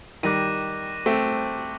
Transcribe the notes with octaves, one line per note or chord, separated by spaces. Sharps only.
D#3 G3 D6 F#6 A#6 D#7
A3 C4